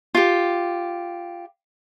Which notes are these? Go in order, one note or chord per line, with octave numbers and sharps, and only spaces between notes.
F4 G4